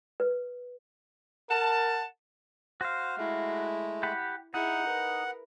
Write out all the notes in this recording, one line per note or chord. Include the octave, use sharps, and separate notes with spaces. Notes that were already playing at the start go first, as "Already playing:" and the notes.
B4
A#4 F#5 A5
F#4 C5 F5
G#3 A3 E4
G4 F#5 B5
D#4 E4 G#4 F#5
A#4 B4